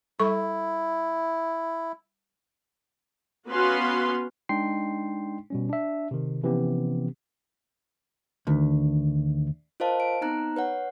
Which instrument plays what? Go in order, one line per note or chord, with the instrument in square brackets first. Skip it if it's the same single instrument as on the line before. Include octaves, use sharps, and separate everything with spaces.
[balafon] G3 A4 C#6 [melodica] E4
[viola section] B3 C#4 F#4 B4 F5 C6
[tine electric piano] G#3 D4 D#4 G5 C6 C7
B2 G3 C#4
D4 E5
C3 D#3
C3 E3 F3 B3 C#4 G4
[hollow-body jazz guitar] D2 [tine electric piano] D#3 D4
[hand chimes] F4 A#4 C5 D#5 F5 A5
D7
B3 C4 D#4 A#5 F#6
B4 C#5 F#5